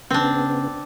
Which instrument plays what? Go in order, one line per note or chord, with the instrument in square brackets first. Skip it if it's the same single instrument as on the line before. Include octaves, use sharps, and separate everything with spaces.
[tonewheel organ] C#3 B3 [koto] C4 D4